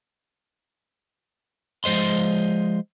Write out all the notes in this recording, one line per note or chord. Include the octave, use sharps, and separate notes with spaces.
F3 G#3 C5 D#5 C6